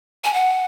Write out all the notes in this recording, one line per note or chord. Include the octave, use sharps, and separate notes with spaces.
G#5
F#5